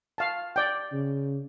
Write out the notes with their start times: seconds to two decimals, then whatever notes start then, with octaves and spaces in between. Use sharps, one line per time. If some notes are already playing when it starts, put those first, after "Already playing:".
0.18 F5 A5
0.56 D5 G5
0.92 C#3